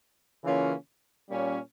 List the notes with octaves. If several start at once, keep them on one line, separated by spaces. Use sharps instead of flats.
C#3 E3 A#3 C#4 F4
A#2 G3 A#3 C#4